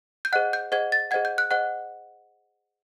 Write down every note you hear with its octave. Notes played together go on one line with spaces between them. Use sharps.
G6
G#4 C5 D#5 F#5 F#6
G6
G#4 C5 D#5 F#5 G#6
A6
G#4 C5 D#5 F#5 G#6
G6
F#6
G#4 C5 D#5 F#5 F#6